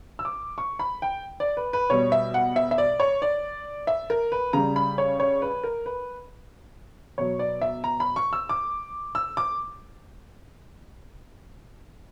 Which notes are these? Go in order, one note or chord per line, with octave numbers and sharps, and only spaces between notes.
E6
D6
C#6
B5
G5
D5
B4
B4
B2 G3 C#5
E5
F#5
E5
E5
D5
C#5
D5
E5
A#4
B4
C#3 G3 A#5
B5
C#5
C#5
B4
A#4
B4
B2 F#3 C#5
D5
E5
A#5
B5
C#6
E6
D6
E6
D6